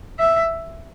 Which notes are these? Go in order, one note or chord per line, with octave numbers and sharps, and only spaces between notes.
E5